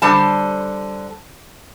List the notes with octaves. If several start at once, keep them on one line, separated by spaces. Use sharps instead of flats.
D3 G3 C5 A5